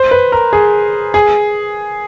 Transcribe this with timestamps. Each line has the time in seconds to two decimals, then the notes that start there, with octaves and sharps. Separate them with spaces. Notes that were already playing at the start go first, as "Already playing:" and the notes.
Already playing: C5
0.11 B4
0.32 A#4
0.53 G#4
1.14 G#4